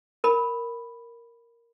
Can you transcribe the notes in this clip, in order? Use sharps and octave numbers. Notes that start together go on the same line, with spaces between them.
A#4 B5